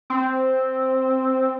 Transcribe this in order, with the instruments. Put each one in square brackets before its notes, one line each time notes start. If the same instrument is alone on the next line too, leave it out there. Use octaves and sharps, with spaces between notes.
[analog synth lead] C4